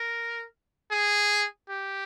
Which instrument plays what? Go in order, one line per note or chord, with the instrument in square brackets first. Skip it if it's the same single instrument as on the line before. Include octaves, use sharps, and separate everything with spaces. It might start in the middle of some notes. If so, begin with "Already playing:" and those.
Already playing: [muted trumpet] A#4
G#4
G4